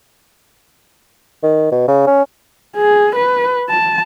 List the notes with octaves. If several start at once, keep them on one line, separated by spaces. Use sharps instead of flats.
D#3
B2
C#3
C#4
G#4
B4
A5